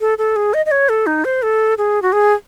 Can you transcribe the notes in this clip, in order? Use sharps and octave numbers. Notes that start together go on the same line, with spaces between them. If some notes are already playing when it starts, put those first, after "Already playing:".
A4
A4
G#4
D#5
D#5
C#5
A4
D#4
C5
A4
G#4
F#4
G#4